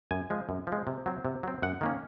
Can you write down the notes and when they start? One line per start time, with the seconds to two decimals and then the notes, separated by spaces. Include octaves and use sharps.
0.11 F#2 G#5
0.30 F3 G#3
0.49 F#2
0.67 F3
0.72 G#3
0.87 C3
1.06 F#3 C4
1.25 C3
1.43 F#3 C4
1.62 F#2 F#5
1.81 D#3 A#3 C#4